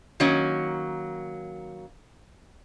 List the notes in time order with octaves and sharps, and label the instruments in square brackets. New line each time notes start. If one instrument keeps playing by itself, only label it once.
[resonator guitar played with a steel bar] D#3 F#3 A#3 C#4